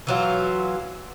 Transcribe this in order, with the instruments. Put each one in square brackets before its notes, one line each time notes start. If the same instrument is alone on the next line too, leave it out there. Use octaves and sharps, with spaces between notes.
[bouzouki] E3 F#3 F4